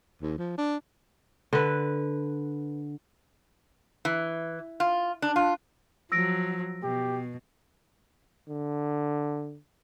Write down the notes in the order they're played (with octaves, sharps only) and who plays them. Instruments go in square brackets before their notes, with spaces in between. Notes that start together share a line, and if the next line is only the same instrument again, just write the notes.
[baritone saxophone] D#2
F3
D4
[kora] D3 B4
[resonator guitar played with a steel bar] E3
F4
D4
F4
[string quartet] F3 F#3 [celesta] E6 A#6 D7
[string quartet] B2 [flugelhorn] G4
[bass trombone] D3